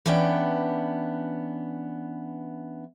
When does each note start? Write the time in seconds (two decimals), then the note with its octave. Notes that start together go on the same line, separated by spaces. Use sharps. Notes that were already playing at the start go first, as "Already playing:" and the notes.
0.06 E3 B3 C#4 D4 G5